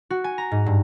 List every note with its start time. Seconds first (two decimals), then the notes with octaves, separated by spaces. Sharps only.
0.10 F#4
0.24 G#5
0.38 A#5
0.51 G#2
0.66 G2